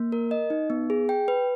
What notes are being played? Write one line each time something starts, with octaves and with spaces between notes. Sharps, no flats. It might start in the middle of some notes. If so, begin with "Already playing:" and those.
Already playing: A#3
A#4
D#5
D#4
B3
G#4
G5
B4